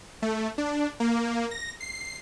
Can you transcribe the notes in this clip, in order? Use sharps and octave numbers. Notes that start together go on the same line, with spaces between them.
A3
D4
A#3
A#6
C7